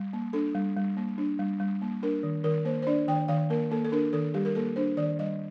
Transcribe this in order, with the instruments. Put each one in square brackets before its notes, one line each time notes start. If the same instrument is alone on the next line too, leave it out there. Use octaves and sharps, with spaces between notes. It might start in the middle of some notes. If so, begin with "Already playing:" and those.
Already playing: [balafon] G3
A#3
D4 A4
G3
G3
A#3
D4
G3
G3
A#3
D4 A#4
D#3
D#3 A#4
A#3 C5
C5
D4 D5
D#3 G5
D#3 F5
A#3 A#4
A#3 A4
A4
D4 A#4
D#3 A4
G3 G4
A#4
A#3 A4
D4 C5
D#3 D5
G3 D#5